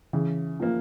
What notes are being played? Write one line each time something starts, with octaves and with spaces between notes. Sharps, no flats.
C#3 E3
F3 A#3